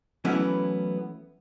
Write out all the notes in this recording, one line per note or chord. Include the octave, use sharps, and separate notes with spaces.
E3 F#3 A3 B3 C#4 E4